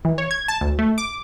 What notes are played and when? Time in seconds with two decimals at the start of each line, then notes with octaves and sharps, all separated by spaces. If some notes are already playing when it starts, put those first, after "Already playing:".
0.05 E3
0.18 C#5
0.31 G#6
0.48 A5
0.61 D2
0.79 A3
0.98 D6